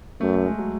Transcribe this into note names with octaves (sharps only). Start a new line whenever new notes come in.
F#2 A3
A3
G#3
F#3